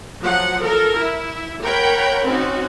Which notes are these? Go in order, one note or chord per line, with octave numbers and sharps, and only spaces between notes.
F3 F#3 F#5
A4 A#4
E4
A#4 C#5 F#5 G5 B5
C4 C#4 D#4 F#4